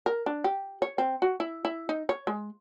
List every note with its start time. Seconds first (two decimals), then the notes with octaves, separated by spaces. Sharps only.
0.06 A#4
0.26 D4
0.44 G4
0.82 C#5
0.98 C4
1.22 F#4
1.40 E4
1.65 E4
1.89 D#4
2.09 C#5
2.27 G#3